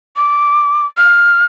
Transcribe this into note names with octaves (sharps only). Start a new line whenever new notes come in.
D6
F6